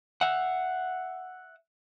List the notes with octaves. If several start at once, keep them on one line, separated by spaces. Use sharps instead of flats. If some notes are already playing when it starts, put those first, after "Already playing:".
E5 F#5